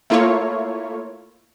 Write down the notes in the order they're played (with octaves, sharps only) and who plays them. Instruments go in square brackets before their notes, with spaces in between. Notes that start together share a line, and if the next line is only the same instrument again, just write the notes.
[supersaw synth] A3 A#3 E4 F4 C#5